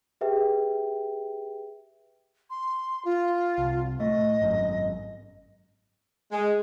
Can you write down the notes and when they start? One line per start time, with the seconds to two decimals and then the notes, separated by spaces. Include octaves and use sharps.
0.21 G4 G#4 B4 E5 G5
2.50 C6
3.05 F4
3.58 C2
3.99 A2 A3 D#5
4.42 G#1 F#2
6.32 G#3